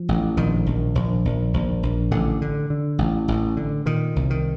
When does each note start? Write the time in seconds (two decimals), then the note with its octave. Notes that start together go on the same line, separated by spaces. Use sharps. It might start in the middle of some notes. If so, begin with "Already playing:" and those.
Already playing: F3
0.09 A1
0.37 A#1 D#3
0.66 A#1
0.95 A#1
1.25 A#1
1.53 A#1
1.83 A#1
2.11 A1 D3
2.42 D3
2.70 D3
2.98 A1
3.28 A1
3.57 D3
3.86 A#2 D#3
4.16 C2
4.30 D#3